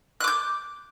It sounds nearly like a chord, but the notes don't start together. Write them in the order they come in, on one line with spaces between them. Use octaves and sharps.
F#6 D6 G6